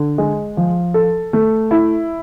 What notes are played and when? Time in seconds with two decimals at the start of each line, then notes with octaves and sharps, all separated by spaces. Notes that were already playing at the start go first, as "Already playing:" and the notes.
Already playing: D3
0.18 G#3
0.57 F3
0.94 A4
1.33 A3
1.71 E4